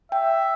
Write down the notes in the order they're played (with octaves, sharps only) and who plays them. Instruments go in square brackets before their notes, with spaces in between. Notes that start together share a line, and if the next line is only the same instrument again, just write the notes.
[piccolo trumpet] E5 [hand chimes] G5